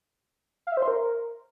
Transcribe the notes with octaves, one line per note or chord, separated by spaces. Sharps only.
F5
E5
C5
C6
A#4